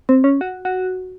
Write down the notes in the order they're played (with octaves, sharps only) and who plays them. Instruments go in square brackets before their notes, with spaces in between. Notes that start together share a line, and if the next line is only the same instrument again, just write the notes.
[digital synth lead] C4
C#4
F#4
F#4